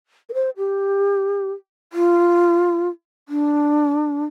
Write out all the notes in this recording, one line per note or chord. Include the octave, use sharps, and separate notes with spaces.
A#4
C5
G4
F4
D4